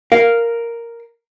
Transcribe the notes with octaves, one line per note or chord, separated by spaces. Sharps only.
A#4 F5